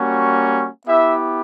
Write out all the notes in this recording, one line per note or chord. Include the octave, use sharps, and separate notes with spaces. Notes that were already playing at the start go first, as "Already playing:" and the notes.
Already playing: G3 A#3 C#4 F#4
B3 E4 G4 E5